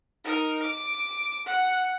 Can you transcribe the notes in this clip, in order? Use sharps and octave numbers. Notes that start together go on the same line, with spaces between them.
D#4 A#4
D6
F#5